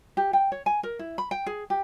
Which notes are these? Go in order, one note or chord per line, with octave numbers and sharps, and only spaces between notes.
G4
G5
C#5
G#5
A#4
E4
B5
G5
G#4
G4